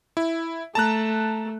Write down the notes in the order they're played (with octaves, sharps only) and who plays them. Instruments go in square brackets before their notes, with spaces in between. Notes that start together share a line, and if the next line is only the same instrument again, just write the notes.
[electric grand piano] E4
[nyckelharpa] A3 [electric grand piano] A5 A#5 F#6